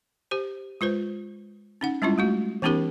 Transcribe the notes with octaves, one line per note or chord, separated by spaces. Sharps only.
G4 C5
G#3 F4 B4 C5
C#4 D#4 F#5
G3 G#3 C#4 D4 E4 F4
G#3 A3 F#4
E3 B3 C#4 D#4 G4 A#4